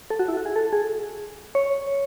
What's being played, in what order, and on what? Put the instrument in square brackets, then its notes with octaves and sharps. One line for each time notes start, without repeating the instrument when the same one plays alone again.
[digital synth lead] A4
F#4
E4
F#4
G#4
A4
G#4
C#5